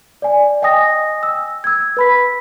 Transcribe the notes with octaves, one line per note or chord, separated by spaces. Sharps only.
D5 G#5
D#5 G5 G#5 D#6 A#6
E6
E6 G#6
B4 B5 B6